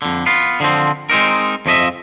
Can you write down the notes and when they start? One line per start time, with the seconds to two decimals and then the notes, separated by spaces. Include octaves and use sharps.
0.02 F2 D3
0.26 B3 F4
0.60 D3 F3 C4
1.10 G#3 C4 D#4 A#4
1.66 F2 F3 D#5 E5